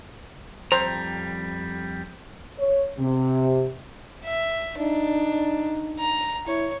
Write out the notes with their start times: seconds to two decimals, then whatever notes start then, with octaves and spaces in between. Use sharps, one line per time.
0.72 F2 G3 C5 A#5
2.58 C#5
2.99 C3
4.25 E5
4.78 D4 D#4
5.99 A#5
6.47 E4 C#5